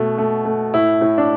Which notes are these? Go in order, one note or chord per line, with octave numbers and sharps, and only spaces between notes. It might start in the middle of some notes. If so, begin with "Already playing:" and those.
Already playing: B2 A3
A3
A3
A2 E4
A2
D4